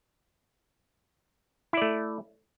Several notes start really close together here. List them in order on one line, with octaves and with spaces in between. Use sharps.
E4 D5 A3